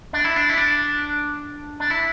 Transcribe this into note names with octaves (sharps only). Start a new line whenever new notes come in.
D4
E4
D4
E4
D4
D4
E4